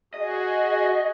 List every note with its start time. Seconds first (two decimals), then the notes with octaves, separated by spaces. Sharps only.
0.14 F#4 G#4 D#5